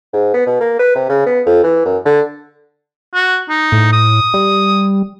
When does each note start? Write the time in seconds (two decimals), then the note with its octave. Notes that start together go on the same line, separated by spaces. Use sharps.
0.13 G#2
0.34 B3
0.47 B2
0.60 A#3
0.79 B4
0.95 C3
1.09 C#3
1.26 B3
1.46 F2
1.63 E3
1.85 F#2
2.05 D3
3.14 F#4
3.50 D#4
3.72 A2
3.93 D#6
4.34 G3